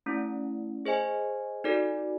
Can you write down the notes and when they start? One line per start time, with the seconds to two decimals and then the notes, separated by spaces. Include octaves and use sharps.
0.06 A3 C#4 E4
0.85 G#4 C5 D#5 G#5
1.64 D#4 F#4 A4 D5